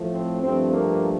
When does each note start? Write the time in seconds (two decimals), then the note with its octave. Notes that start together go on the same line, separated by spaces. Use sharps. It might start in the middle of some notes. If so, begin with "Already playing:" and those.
Already playing: A2 F3 A3
0.11 C4
0.42 G2 F3 A3 C4
0.72 A#3